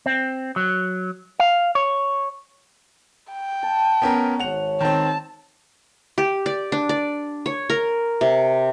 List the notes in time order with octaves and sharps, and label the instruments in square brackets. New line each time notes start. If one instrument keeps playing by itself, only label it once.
[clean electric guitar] C4
F#3
F5
C#5
[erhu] G5
[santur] A5
[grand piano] B3 C#4 A#4
[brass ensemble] G#1 C#5 [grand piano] F#5 F7 [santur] E6
[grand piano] D#3 C4 [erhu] A5
[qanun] G4
D5
D4
D5
C#5
A#4
C3